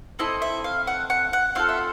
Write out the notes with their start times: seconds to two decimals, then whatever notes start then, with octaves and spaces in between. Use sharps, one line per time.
0.19 C4 E4 A4 D#5
0.42 E5
0.64 F5
0.87 F#5
1.10 F#5
1.33 F#5
1.55 C4 F4 A4 F5
1.69 E5